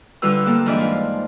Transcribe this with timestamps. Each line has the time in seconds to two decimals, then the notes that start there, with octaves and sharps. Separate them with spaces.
0.22 D3 G3 F4 B4 E6
0.46 A#3 C4 F4 A4
0.66 G#2 E3 F3 D4 D5 E5
0.81 F4